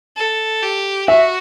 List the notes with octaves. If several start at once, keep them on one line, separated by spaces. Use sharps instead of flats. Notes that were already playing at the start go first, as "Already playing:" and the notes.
A4
G4
F#4 E5